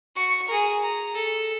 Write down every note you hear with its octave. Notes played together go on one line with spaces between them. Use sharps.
F#4 C#6
G#4 A#4
A#5
A4